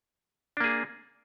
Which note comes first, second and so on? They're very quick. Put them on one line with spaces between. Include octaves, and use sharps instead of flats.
D4 A#3 G#4